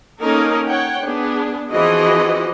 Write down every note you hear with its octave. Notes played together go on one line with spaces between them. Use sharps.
A#3 C#4 D#4 A4 A#4
C#5 F#5 G5
B3 D4 G#4
E3 F3 C4 F#4 G#4 D#5